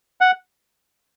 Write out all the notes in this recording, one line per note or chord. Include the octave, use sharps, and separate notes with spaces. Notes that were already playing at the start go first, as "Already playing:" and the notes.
F#5